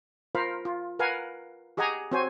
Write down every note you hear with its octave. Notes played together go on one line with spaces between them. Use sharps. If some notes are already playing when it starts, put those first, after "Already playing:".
F4 A#4 C5 F5 B5
F4
A#4 B4 F5 F#5 G#5
G4 G#4 D#5 F#5 G#5 A#5
C4 F#4 C5 C#5 G#5